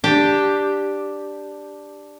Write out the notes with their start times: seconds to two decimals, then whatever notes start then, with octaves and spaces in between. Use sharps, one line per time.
0.04 D4 G4